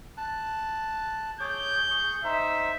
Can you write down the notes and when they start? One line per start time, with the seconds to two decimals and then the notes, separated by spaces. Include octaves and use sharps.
0.17 A5 F#6
1.40 G#4 C#5 D6 G6
1.91 G#4 C#6
2.24 D#4 C5 E5